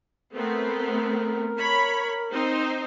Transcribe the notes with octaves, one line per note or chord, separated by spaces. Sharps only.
A3 B3 C4 A#4
C#5 B5
C4 D#4 C5